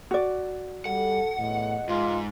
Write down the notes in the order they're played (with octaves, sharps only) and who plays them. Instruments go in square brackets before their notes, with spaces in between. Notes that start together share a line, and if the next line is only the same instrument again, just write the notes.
[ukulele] F#4 D5
[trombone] G3 [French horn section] A4 [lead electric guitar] F#5
[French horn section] E2 D#5 [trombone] A2
[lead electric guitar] G#2 [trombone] F4